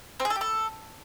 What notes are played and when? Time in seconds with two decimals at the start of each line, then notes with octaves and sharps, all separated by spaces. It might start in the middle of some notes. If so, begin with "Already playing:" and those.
0.20 C4
0.25 G#4
0.30 A4
0.36 G4
0.41 A4